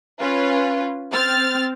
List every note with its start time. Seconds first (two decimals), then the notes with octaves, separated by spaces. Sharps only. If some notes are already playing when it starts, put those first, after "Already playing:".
0.20 C#4 F4 B4
1.11 C4 F6 A6